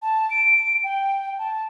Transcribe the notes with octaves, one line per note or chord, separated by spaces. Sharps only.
A5
D7
G5
A5